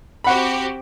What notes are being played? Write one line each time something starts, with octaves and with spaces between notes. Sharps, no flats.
C4 F#4 G4 F#5 B5